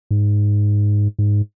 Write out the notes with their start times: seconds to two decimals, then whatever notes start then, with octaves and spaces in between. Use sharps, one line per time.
0.11 G#2
1.19 G#2